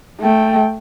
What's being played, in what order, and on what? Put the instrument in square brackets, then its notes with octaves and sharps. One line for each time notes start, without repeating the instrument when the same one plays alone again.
[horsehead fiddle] A3 G5